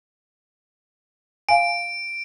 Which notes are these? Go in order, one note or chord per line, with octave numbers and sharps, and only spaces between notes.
F5 G#5 D7